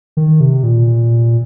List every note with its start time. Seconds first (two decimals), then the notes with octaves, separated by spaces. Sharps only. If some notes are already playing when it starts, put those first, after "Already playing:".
0.17 D#3
0.41 C3
0.63 A#2